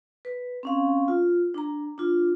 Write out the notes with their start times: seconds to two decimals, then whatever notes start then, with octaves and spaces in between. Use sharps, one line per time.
0.25 B4
0.63 C4 C#4 F5
1.08 F4
1.54 D4 A#5
1.98 D4 F4